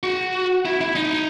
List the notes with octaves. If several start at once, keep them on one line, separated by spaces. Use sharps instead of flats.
F#4
E4
E4
D#4